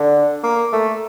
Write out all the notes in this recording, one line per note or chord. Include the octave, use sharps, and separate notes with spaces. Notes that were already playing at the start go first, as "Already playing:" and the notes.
Already playing: D3
A#3
A3